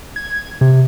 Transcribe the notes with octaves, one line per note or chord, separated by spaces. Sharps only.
G#6
C3